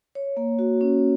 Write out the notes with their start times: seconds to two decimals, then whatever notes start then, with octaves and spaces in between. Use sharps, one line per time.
0.15 C#5
0.37 A#3
0.59 F#4
0.81 C#4